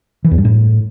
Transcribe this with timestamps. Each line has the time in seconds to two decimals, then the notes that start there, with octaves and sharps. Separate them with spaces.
0.24 E3
0.31 E2
0.38 G2
0.45 A2